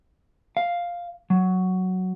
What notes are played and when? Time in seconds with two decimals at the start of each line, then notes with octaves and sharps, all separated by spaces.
0.57 F5
1.30 F#3